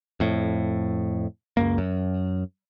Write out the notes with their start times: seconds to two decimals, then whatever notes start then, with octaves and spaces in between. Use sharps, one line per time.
0.20 F2 A2
1.57 C#2 F#2 A#3
1.78 F#2